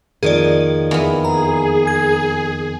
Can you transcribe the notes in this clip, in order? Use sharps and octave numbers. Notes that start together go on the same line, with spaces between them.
F2 D#3 A#3 G#4 D5
E2 B3
G#4 A#5
G#6